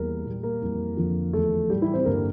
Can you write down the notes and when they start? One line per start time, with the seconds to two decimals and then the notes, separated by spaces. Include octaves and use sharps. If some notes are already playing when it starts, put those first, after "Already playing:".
Already playing: E2 E3 G3 A#3 A#4
0.25 A#2 G3
0.43 A#3 A#4
0.61 F2 E3 G3
0.97 F2 D3 F3
1.33 E2 D3 F3 A3 A4
1.70 A2 G3 G4
1.82 E3 E4
1.94 C4 C5
2.06 G2 D3 G3 A#3 A#4